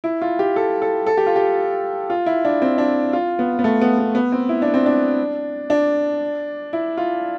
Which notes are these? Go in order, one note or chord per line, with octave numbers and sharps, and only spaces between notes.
E4
F4
G4
A4
A4
A4
G4
F4
G4
F4
E4
D4
C4
D4
F4
B3
B3
A3
B3
B3
B3
C4
E4
D4
C4
D4
D4
E4
F4